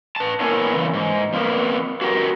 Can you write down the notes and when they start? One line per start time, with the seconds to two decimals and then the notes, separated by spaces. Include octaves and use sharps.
0.16 B4 A5
0.40 A#3 B3 E4 A#4 C#5 G#5
0.73 C#3 E3
0.94 G#2
1.33 F2 A#3 B3
2.01 F#4 G4 A#4